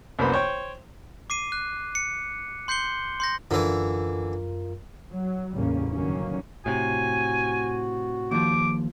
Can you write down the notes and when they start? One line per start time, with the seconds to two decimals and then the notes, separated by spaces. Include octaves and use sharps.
0.19 C2 F#2 A#3 B3 C5 B5
0.32 C5 C#5 G5
1.30 D6 C7 D#7
1.52 F#6
1.95 C#7
2.68 C6 G6 C7 C#7 G7
3.20 C6 G6 A#6
3.51 F#2 D3 E3 F4 A#4
5.12 F#3
5.56 A1 E2 C#3 G3 A#3 C#4
5.93 F#1 D3 D#3 F#3 A#3 C#4
6.66 A2 C3 F#4 G#5
8.31 D#2 F3 D6